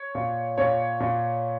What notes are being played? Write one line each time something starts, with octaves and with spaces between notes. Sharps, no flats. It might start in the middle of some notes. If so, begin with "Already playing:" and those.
Already playing: C#5
A#2
A#2 C#5
A#2